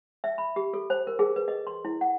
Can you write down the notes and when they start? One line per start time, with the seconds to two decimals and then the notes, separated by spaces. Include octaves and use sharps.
0.24 E5
0.38 B5
0.56 G4
0.74 A4
0.90 C5
1.07 A#4
1.19 G#4
1.36 B4
1.48 D#5
1.67 C6
1.85 E4
2.01 F#5